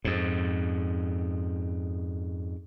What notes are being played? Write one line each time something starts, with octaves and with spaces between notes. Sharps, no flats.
F2 G#2